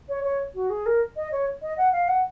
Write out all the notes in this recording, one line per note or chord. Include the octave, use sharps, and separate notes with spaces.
C#5
C#5
F#4
G#4
A#4
D#5
C#5
D#5
F#5
F5
F#5